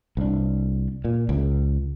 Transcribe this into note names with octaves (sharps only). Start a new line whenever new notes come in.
C2 D4
A#2
C#2